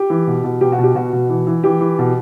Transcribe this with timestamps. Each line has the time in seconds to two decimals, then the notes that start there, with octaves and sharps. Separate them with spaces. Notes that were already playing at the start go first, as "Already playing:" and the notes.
Already playing: G4
0.10 E3
0.27 B2
0.44 B2
0.61 B2 G4
0.72 F#4
0.79 B2 G4
0.95 B2 F#4
1.13 B2
1.29 E3
1.47 E3
1.64 E3 G4
1.81 E3
1.99 B2